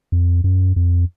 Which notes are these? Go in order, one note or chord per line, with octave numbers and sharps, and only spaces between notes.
F2
F#2
F2